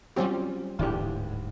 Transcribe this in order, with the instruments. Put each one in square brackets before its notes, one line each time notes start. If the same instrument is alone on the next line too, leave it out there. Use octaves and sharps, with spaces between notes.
[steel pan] F#3 C4 G4 [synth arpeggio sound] G3 C#4 F4
[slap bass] D1 G#2 [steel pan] E3 D4 G4